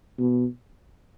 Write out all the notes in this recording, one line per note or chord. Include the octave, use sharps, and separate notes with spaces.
B2